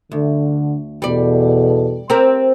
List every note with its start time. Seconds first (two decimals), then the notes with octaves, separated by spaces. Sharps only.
0.12 D2 D3
1.02 E2 B2 G3 A4 D5
2.10 C4 G4 A#4